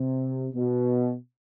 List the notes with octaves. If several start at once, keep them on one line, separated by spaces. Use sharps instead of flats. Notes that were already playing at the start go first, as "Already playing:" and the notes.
Already playing: C3
B2